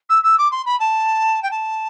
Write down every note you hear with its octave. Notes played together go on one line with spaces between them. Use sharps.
E6
E6
D6
C6
B5
A5
G5
A5